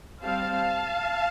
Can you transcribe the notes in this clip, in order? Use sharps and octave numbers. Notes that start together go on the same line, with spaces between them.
G3 C4 F5 A5